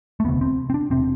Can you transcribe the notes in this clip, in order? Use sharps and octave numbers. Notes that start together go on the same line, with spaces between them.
A3
E1 D2 C3 B3
C4
C4
D4
E1 C3 C4